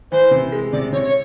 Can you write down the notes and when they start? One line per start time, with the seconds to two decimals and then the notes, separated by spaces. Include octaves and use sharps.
0.12 E3 C5
0.31 C3
0.52 G#3
0.72 C3 D5
0.92 C3 C#5
1.04 C#5